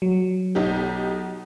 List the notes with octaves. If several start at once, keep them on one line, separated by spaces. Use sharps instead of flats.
F#3
B1 D#4 G4